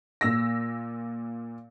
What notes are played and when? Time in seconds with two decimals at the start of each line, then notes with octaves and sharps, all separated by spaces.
0.21 A#2 E6 A#6